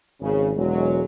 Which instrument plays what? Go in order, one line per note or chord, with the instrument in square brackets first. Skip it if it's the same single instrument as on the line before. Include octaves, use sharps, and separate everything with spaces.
[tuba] G#1 [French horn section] C#3
[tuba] E1 [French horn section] F#3 G#3